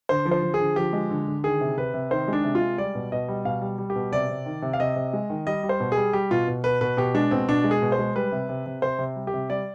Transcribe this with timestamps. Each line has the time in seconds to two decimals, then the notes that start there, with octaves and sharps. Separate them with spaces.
0.09 D3 C5
0.26 F3
0.31 C5
0.42 F3
0.54 G#4
0.60 D3
0.76 F3 G4
0.93 G#3
1.10 D3
1.27 D3
1.44 D#3 G#4
1.61 C3
1.77 C3 B4
1.94 C3
2.11 D#3 C5
2.28 G#3 D4
2.44 C3
2.55 F4
2.61 G#3
2.78 G3 D5
2.95 B2
3.12 B2 D#5
3.28 G3
3.45 B2 F5
3.62 G3
3.78 G3
3.90 G4
3.95 B2
4.12 C3 D5
4.29 C3
4.46 D#3
4.62 C3
4.73 F5
4.79 C3 D#5
4.96 C3
5.13 G#3
5.30 D#3
5.47 G3 D#5
5.63 G3
5.69 C5
5.80 B2
5.92 G3 G#4
6.13 G3 G4
6.31 B2 F4
6.47 B2
6.64 B2 B4
6.81 B2 B4
6.97 B2 G4
7.15 G#3 D4
7.31 B2 C4
7.48 B2 D4
7.64 G#3
7.71 G#4
7.82 B2
7.92 C5
7.99 G#3
8.15 G3 B4
8.32 C3
8.49 C3
8.66 C3
8.82 C3 C5
8.98 C3
9.16 G3
9.27 G4
9.33 C3
9.50 G3 D5